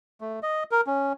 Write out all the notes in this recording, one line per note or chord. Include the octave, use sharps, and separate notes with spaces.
A3
D#5
A#4
C#4